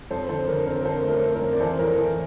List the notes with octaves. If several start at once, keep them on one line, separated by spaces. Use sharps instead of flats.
F2 A4 C5
D3 A4 C5
D3 A#4
C4 A#4
A#4
D3 A4 C5
A3
A#4
C4
A#4
F2
D5
E3 A4 C5
A2 A#4
E3